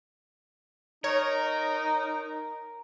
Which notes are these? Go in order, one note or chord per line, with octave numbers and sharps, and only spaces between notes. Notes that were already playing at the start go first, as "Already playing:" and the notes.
D#4 A#4 C#5